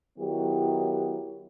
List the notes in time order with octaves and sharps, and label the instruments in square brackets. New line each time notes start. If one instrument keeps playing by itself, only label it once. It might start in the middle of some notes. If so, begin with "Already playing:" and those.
[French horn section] D#3 F#3 B3 E4 G4